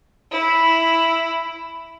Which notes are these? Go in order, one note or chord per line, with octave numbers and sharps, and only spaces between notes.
E4